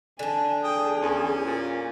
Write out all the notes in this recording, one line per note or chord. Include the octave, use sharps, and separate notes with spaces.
D3 D4 G#5
G#4 G5 D#6
E2 C#4
A#2